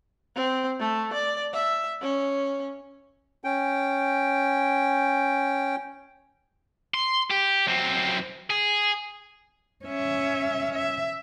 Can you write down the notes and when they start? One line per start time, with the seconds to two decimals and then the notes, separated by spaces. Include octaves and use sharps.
0.36 C4
0.79 A3
1.13 D5
1.53 E5
2.02 C#4
3.44 C#4 G5
6.94 C6
7.31 G4
7.67 F#2 C4
8.50 G#4
9.85 C#4 E5
10.74 E5